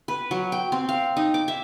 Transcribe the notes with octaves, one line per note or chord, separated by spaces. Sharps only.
B4
F#3
G5
C4
F5
D#4
D6
E5